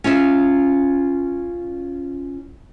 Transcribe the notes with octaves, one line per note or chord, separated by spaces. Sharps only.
C#4 F4 D#5 E5